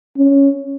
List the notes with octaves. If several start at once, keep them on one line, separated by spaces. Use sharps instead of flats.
C#4